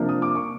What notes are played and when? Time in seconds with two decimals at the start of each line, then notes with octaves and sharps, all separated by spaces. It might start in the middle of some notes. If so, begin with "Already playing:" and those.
Already playing: C3 F3 A#3 D4
0.09 D#6
0.22 D6
0.35 C#6